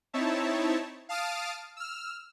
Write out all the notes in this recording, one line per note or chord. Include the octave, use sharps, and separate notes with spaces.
C4 D#4 E4 C#5 E5 A5
F5 A5 D#6 F6 D7
E6 F6